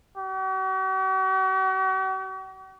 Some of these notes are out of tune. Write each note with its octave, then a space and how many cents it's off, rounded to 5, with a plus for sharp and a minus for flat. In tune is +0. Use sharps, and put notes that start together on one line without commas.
F#4 +45